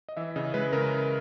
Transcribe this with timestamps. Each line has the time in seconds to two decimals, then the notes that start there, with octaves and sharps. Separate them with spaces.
0.09 D#5
0.17 E3 E5
0.36 C#3 D#5
0.54 G#3 B4
0.73 C#3 A#4